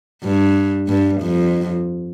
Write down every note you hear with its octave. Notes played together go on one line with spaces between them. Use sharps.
G2
G2
F2